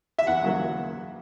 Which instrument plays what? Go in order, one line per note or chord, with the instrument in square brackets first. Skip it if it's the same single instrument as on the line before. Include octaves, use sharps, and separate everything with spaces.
[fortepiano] E5
E2 F#5
C#3 F#3 A#3